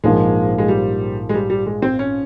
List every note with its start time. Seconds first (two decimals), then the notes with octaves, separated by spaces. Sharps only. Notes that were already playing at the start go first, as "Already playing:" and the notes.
0.04 A#1 G#2 F3 G#3 A#3
0.58 G#3
0.68 G3
1.29 G#3
1.34 G3
1.50 G3
1.66 G#3
1.82 C4
1.99 C#4